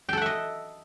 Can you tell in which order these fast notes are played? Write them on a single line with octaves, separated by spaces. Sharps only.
G5 A4 F#5 E5 D#5